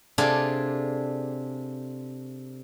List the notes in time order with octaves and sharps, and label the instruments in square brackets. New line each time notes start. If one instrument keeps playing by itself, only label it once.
[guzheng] C3 D4 F4 G#4 A4